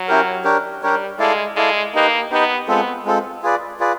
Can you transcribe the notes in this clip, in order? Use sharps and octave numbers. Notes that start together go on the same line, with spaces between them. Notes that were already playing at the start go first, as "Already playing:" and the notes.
Already playing: F#3
C#4 E4 G4 A#4
D4 G4 A#4 C#5
G3 D4 G4 A#4 C#5
G#3 E4 A4 D5 F5
G#3 E4 A4 D5 F5
A#3 D#4 G4 B4 D#5
B3 D#4 G4 B4 D#5
G#3 B3 C4 F4 A4
G#3 C4 F4 A4
F4 G#4 B4 D5
F4 G#4 B4 D5